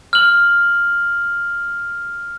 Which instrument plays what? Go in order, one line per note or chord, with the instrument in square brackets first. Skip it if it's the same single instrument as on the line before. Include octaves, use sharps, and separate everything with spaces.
[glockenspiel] F6 F#7